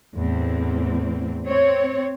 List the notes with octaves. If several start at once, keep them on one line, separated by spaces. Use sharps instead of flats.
E2 A2 C4
C4 C#5